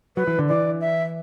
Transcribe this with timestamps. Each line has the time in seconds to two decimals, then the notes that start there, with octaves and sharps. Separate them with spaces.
0.16 F#3 B4
0.27 E3
0.39 D3
0.49 E3 D5
0.81 E5